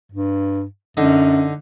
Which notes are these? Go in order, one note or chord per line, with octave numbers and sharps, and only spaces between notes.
G2
F#2 D3 D#4